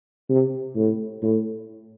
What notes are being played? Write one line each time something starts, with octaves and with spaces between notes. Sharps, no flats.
C3
A2
A2